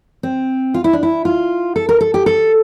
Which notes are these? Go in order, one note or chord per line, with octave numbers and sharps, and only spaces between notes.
C4
F4
E4
D4
E4
F4
A4
A#4
A4
G4
A4